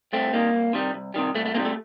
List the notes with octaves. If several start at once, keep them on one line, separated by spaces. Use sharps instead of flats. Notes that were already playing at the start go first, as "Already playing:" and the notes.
C2 A3 C4
C3 D#3 G3 A#3
C2
C3 D#3 G3
C2
C3 D#3 G3
C2 A3
A3
C3 D#3 G3 A#3
A3